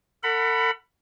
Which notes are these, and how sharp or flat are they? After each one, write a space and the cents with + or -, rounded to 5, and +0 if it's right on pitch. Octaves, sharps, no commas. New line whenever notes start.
A4 +45 F#5 +0 B5 +5